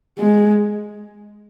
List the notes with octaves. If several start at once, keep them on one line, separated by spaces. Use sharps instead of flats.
G#3